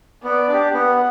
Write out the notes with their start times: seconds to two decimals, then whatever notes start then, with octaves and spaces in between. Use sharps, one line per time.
0.24 B3 D5
0.48 D4 G4
0.73 B3 F#5